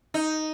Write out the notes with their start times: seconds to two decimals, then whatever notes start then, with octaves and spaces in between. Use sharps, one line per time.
0.14 D#4